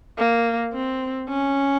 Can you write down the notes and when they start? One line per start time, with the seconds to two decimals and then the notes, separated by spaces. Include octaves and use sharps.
0.18 A#3
0.73 C4
1.29 C#4